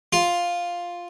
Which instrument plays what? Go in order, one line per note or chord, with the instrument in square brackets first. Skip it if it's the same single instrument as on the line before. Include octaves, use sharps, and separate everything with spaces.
[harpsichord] F4